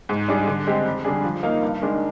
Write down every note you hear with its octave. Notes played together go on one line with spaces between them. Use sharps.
G#2
G3 D4 G#4 D5
D3
G#3 C4 G4
F2
D3 G3 D4 G#4
F3
A#3 D#4 A#4 F5
G2
D#3 G#3 D4